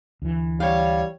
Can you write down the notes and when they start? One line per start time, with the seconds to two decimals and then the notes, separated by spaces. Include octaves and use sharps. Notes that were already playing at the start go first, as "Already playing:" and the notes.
0.22 D2 E3
0.60 G3 C#5 F5